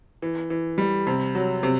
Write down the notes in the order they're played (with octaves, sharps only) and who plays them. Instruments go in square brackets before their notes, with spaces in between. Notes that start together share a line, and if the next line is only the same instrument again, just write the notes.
[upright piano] E3
E3
G3
C3
F#3
C3